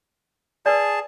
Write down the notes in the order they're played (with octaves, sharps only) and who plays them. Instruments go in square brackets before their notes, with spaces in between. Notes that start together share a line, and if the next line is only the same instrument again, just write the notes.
[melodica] G#4 A5 [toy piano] B4 D5